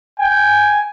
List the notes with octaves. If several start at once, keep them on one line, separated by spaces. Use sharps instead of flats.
G5 G#5